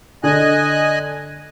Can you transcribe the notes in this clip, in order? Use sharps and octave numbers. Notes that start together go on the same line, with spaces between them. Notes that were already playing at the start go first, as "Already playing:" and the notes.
D3 D#5 G#5 F#6